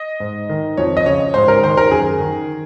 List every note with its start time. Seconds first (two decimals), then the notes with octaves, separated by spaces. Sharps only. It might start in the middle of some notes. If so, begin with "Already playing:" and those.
Already playing: D#5
0.20 G#2
0.49 D#3
0.77 F2 C#5
0.97 D#5
1.06 C#3 C#5
1.34 G#2 C5
1.48 A#4
1.63 D#3 C5
1.77 A#4
1.91 F#2 G#4
2.20 D#3